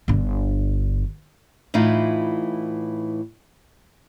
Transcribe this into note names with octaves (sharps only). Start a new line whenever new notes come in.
G1 D3
A2 E3 D#4 F4